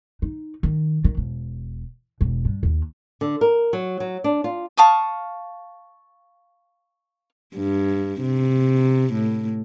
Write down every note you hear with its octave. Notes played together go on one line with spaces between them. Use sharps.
D#4
D#3
D#3
E1
E1
G2
D#2
D3
A#4
F#3
F#3
D4
F4
F5 A5 C#6 D#6
G2
C3
A2